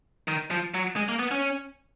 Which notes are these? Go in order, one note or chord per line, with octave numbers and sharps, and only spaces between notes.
D#3
F3
F#3
G#3
A#3
B3
C#4